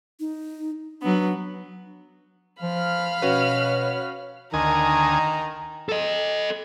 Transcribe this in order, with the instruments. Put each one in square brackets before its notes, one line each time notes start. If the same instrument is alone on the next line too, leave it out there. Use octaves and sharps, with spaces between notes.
[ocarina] D#4
[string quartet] F#3 B3 [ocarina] D4
[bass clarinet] F3 [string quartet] F5 B5 F6
[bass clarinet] B2 [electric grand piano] C#4 F#4 B4 [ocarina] C#5
[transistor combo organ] D2 D#5 G#5 [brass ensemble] D#3 [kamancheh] A#5
[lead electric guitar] A4 D#5